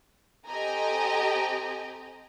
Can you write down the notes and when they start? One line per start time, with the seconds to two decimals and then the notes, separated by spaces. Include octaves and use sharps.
0.45 C4 G4 A4 D#5 G#5 A#5